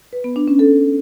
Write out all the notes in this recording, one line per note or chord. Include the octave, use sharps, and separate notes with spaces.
B4
B3
D4
C#4
A4